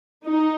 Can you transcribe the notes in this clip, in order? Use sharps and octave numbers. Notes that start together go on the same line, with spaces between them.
D#4